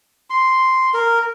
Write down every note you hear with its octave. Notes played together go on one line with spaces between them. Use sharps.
C6
A#4